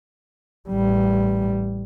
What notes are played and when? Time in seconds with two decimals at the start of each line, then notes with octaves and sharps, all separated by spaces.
0.69 A1 G3